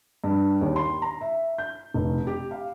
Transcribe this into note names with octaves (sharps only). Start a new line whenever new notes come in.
G2
D#2
C6
A#5
E5
G6
F1
G4
F5